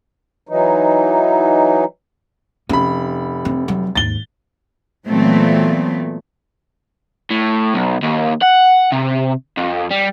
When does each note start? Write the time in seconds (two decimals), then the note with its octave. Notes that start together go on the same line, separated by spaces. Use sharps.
0.49 E3 F#3 D#4
2.69 F1 C#4 B5
3.45 C4
3.68 F#3
3.95 D#2 G#2 A6 G7
5.07 A#2 E3 F#3 A3 B3 C4
7.31 A2
7.75 B1
8.03 D#2
8.43 F#5
8.92 C3
9.58 F2
9.91 G3